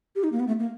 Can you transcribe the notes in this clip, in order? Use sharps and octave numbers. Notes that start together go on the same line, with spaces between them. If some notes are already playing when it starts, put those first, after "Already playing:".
G4
D#4
A#3
B3
A3
A#3